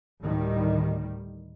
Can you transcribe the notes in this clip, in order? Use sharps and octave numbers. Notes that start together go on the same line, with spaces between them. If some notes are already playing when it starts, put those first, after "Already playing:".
D2 A2 D#3 G3